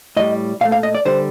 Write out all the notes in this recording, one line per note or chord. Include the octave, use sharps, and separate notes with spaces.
A2 G3 D#5
A#2 A3 F5
F5
D#5
D5
D3 G3 C5